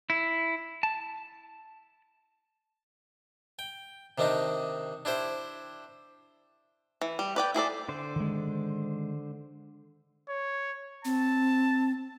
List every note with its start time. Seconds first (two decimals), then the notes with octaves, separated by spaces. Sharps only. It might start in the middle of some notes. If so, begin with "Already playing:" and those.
0.10 E4
0.83 A5
3.59 G5
4.18 C3 D#3 C4 D4 D#4
5.05 D4 E4 G4 C5
7.01 E3
7.19 G3
7.36 B4 D5 G5
7.54 E4 G#4 A4 D5
7.89 D3 C5
8.16 D#3 G#3
10.29 C#5
11.05 C4 A5